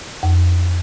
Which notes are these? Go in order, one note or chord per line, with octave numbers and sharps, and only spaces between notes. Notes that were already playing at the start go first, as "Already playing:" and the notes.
F2